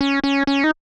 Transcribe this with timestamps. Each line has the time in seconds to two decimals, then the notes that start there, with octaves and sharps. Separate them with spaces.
0.01 C#4
0.24 C#4
0.47 C#4
0.64 D#4